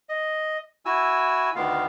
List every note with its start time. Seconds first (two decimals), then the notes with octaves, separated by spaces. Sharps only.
0.09 D#5
0.85 E4 F#4 G#5 E6
1.55 D2 D#3 B3 F4 F5